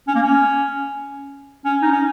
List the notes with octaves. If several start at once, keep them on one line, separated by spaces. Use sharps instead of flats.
C#4
A#3
C#4
C#4
D#4
C#4